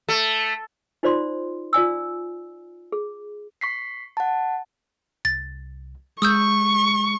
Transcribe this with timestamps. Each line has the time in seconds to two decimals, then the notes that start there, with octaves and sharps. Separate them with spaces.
0.08 A3
1.03 D#4 F4 C5 D5 B5 C6
1.73 F4 D5 G#5 E6
2.92 G#4
3.61 C#6 B6 C7
4.17 F#5 A5
5.25 C2 A6
6.22 G#3 C#6 D#6 E6 G6